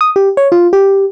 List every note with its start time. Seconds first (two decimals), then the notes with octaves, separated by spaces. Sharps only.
0.01 D#6
0.16 G4
0.37 C#5
0.52 F4
0.73 G4